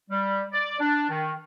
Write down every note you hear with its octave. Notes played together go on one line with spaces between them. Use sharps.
G3
D5
D4
D#3